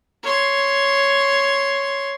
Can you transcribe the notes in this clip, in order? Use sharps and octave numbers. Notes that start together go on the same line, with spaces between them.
C#5 C6